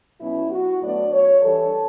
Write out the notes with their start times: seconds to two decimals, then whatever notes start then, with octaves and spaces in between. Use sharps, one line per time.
0.20 B2 F#3 C#4 E4
0.50 F#4
0.81 A2 F#3 B3 D4 D5
1.12 C#5
1.42 E3 G3 D4 A4